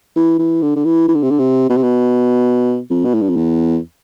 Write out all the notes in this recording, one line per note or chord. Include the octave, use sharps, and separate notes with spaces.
E3
E3
D3
D3
E3
E3
D3
C3
D3
C3
B2
C3
B2
F2
B2
A2
G2
F2
E2